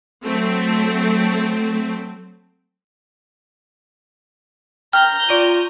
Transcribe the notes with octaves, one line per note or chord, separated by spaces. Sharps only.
F#3 A3 C4
G5 A#5 F6 G6
F4 D5 C#6 D#7